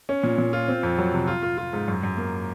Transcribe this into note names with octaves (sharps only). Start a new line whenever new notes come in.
C#4
A#2
A#2
F4
C4
F2
F#3
C3
F4
F4
F4
G#2
F#2
F#2
A#3